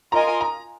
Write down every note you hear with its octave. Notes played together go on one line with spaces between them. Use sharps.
F4 A#4 D#5 G#5 A#5
A#5